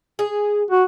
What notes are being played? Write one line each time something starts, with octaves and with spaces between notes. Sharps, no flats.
G#4
F#4